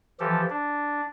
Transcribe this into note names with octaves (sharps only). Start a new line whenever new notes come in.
E3 F3 G4 A4
D4